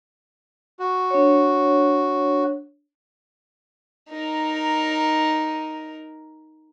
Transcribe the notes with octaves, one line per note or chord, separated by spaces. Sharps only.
F#4
D4 C#5
D#4 A#4